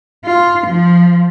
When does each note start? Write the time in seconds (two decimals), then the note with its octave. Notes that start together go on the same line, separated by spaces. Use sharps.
0.25 F4
0.67 F3